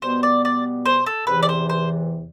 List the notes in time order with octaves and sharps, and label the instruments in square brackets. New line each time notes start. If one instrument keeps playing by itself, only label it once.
[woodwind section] B2 G3 B3 [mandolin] C5
[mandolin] D5
D5
C5
A4
[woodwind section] E2 C3 E3 [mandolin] B4
[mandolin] D5
C5
C5